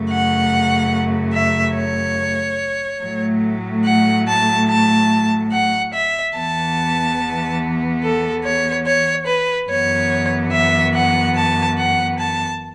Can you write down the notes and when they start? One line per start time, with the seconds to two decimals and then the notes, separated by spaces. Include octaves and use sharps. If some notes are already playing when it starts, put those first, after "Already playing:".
Already playing: F#2 C#3 A3
0.09 F#5
1.33 E5
1.75 C#5
3.00 A2 F#3 A3
3.84 F#5
4.27 A5
4.68 A5
5.52 F#5
5.93 E5
6.35 E2 E3 B3 A5
8.02 A4
8.44 C#5
8.85 C#5
9.27 B4
9.68 F#2 E3 B3 C#5
10.52 E5
10.94 F#5
11.36 A5
11.78 F#5
12.19 A5